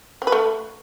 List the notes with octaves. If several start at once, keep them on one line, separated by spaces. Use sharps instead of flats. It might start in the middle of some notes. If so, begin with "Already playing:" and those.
C4
B4
A3